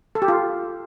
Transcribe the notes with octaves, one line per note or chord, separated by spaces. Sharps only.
A4
G4
F4